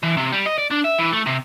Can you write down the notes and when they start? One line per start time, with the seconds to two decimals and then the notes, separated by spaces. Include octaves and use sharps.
0.03 E3
0.17 C3
0.32 G3
0.46 D#5
0.58 D5
0.71 D4
0.84 E5
0.98 E3
1.12 A3
1.26 C3